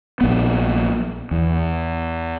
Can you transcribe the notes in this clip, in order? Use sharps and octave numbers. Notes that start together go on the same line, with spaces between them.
A#1 B3
E2